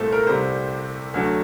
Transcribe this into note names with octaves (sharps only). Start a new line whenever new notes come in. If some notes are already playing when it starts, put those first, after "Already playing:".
Already playing: C2 A#2 A3 A4 C5
A#4
C2 C3 G3 C5
D2 D3 F#3 A3